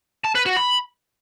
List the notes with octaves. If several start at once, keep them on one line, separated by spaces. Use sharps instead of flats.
A5
B4
F#4
B5